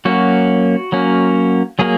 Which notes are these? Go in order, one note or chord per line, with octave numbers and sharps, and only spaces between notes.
F#3 A#3 C#4 F#4
F#3 A#3 C#4
F#3 A#3 G#4